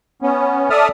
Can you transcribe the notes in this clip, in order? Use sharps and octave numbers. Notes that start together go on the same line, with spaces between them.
B3 C#4
A4 D5 E5 A5 D#6 F6